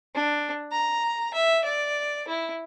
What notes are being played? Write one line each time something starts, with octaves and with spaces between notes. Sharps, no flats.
D4
A#5
E5
D5
E4